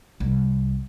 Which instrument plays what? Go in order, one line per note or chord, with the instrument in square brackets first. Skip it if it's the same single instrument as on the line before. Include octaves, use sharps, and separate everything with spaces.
[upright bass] C2